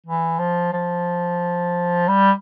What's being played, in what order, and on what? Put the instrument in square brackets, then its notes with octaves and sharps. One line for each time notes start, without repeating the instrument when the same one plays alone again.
[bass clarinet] E3
F3
F3
G3